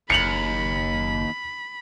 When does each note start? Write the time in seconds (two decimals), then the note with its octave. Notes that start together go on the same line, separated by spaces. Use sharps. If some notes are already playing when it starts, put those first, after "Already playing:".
0.10 F#1 D#2 B5 C#7 F7 F#7